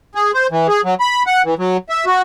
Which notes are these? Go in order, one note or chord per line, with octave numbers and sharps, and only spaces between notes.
G#4
C5
E3
G#4
F#3
B5
F#5
E3
F#3
E5
F#4